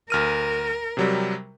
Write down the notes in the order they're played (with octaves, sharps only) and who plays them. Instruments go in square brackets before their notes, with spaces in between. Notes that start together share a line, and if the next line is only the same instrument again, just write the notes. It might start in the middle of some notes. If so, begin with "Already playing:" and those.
[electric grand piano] D2 F6 D#7 [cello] A#4
[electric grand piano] C3 F#3 G3